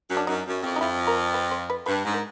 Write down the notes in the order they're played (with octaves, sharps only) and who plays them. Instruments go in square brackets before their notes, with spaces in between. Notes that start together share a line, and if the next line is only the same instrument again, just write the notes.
[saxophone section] F#2
[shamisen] D4
[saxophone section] F#2 [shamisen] D#4
[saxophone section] F#2
F2
[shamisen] D#4
[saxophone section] F2 [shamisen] E4
[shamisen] A#4
B4
C5
B4
[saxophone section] G2 [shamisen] B4
[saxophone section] G#2
[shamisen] A#4